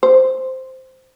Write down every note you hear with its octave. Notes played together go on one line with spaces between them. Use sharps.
C5